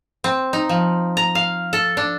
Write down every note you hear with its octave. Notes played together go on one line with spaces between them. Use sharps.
C4
D#4
F3
A#5
F5
A4
D4